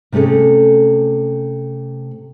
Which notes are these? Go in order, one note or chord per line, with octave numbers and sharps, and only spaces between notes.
C3 A3 C#4 G#4 A4